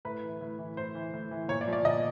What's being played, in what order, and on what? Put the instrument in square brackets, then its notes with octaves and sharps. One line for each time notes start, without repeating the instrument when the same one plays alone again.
[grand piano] A2 B4
E3
A2
E3
A2 C5
E3
A2
E3
A#2 C#5
D5
F3
D5
A#2 D#5